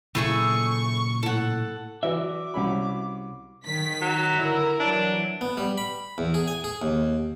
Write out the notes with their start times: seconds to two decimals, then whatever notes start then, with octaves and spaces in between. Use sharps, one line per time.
0.15 A#2 C#3 F#3 A3 E4 G#4 C#6 E6
1.23 A2 A4 F#5
2.03 E3 F#3 F#4 D5 E5 D6
2.54 C2 C#4 B5
3.64 D#3 B6
4.01 F#3
4.37 D3 E4 A#4
4.80 E3 F#3 D4
5.41 B3
5.57 G3
5.78 B5
6.18 E2
6.34 G#4
6.48 G#5
6.64 G#4
6.82 D#2